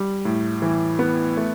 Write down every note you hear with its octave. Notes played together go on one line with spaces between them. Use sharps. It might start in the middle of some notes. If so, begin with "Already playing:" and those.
Already playing: G3
A2
E3
B3
A3